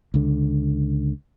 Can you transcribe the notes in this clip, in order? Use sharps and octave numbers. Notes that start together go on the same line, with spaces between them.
C#2 D3